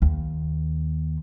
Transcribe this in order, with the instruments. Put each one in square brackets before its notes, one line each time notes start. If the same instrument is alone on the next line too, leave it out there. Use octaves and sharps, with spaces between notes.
[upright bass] D#2